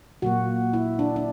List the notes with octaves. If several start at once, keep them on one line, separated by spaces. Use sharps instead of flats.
A#2 F#3 A#3 F#4
E4
D4
D4